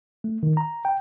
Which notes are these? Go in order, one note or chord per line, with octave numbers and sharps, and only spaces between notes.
A3
D#3
A#5
G5